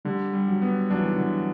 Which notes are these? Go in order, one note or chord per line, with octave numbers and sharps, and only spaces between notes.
D3 G3
G3
F#3
B3
F#3 D4
E3
E3
D3